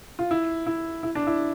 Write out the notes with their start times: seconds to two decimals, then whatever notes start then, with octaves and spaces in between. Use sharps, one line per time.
0.19 F4
0.31 E4
0.67 E4
1.03 E4
1.15 D4
1.27 E4